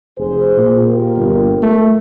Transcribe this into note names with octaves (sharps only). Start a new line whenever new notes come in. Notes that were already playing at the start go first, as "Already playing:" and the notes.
F1 G#4 C5
A#2
F4 G4 A#4
G1
A3